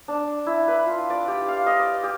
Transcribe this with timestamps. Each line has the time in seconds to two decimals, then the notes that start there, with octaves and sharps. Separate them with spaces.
0.08 D4
0.46 E4
0.68 B4
0.86 F4
1.10 D5
1.28 G4
1.48 F5
1.66 D#5
1.80 D5
2.03 G4